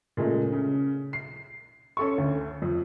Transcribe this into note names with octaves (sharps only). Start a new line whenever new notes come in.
A#2 C#3 G#3 A3
C#3
C7
C#4 A4 C#6
D2
F2